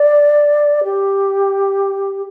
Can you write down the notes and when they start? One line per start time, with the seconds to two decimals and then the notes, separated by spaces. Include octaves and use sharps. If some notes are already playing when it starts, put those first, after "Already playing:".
Already playing: D5
0.84 G4